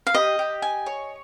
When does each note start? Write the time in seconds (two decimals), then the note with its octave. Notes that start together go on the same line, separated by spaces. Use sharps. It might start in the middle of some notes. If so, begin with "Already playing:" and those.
0.07 F5
0.14 G4 D#5
0.39 G4
0.62 G#5
0.86 C#5